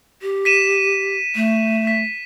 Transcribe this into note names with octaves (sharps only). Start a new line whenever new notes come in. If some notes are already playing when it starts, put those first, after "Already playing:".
G4
B6 D#7 E7
A3
B6